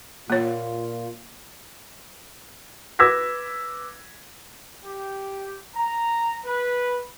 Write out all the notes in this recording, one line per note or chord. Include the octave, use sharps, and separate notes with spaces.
A#2 A#3 F4 C#5
B4 D6 E6 G#6 A#6 B6
G4
A#5
B4